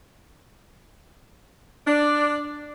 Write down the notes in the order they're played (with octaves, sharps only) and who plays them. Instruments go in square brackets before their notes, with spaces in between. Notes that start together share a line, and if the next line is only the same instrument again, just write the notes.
[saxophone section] D4